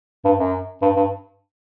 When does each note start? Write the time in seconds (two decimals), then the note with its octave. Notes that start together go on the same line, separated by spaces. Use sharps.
0.25 G2
0.39 F#2
0.82 G2
0.97 G2